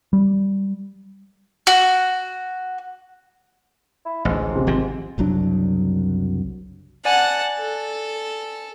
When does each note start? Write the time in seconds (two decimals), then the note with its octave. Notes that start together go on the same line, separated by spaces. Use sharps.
0.13 G3
1.67 F#4
4.05 E4
4.25 A1 D2 G#2
4.51 C3 C6
4.67 G#1 F3 C4
5.18 F#1 C2 F#3 D4
7.05 D5 F#5 G#5 A5
7.59 A4